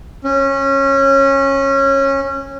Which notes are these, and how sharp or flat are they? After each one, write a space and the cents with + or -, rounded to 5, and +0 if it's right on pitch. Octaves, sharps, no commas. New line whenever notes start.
C#4 -20